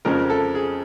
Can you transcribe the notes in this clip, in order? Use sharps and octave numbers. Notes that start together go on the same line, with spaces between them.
F2 C#3 F3 G#3 A#4
A4
G#4